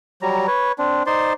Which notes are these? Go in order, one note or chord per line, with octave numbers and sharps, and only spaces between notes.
F#3 G3 A#5
B4 C#5
C4 D4
D#4 C5 D5 C6